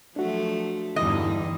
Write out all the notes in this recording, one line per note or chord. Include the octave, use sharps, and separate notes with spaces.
F3 F#3 A3 D4 F#4
E2 G2 D3 E3 G3 D#4 D#5